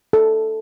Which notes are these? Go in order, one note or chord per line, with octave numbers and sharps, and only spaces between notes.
A4